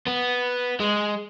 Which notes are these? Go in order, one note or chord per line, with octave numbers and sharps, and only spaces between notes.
B3
G#3